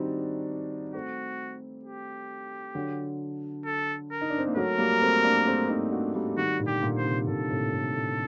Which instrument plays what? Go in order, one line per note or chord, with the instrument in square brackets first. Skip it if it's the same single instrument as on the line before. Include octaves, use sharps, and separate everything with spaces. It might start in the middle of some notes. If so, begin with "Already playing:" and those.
Already playing: [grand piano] D#3 G3 C4 D4 D#4 F#4
[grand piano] A3 C4 [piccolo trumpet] F#4
[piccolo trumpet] G4
[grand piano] D3 F#3
[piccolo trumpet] A4
A#4
[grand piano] D#4
D4
C4
A#3
[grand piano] F#3 A3 [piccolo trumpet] A#4
[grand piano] G3 A#3
A3 C4
A#3 D4
A3 C4
C4 D#4
D4 F#4
G3 A#3
[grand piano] D#3 G3 [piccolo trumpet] F#4
[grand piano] A#2 D3
[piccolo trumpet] G4
[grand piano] A#2 D3
[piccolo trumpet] C5
[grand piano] C3 D#3
[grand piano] A#2 D3 [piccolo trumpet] A4
[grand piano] A2 C3
A2
A2